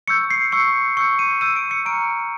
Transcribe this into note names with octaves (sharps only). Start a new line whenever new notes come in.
C#6 E6 G6 C#7
C7
C#6 E6 G6 C#7
C#6 E6 G6 C#7
D#7
C#6 E6 G6 D#7
D7
C#7
A#5 C#6 F6 D7